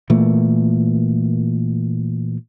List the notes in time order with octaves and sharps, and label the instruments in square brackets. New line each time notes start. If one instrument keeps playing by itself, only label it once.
[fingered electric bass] A#2 E3 A3 A#3